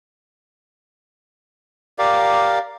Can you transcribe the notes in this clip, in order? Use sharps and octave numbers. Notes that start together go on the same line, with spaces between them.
G4 A#4 D5 F5